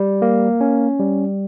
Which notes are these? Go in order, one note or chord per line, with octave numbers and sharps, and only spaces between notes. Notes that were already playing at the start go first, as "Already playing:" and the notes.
Already playing: G3
A#3
C#4
G3